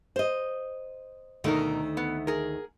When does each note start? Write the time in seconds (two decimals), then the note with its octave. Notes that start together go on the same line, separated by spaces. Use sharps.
0.16 C5 D#5
1.44 D2 B2 D#3 A3 D#4 A#4
1.97 B3
2.27 G#4 A#4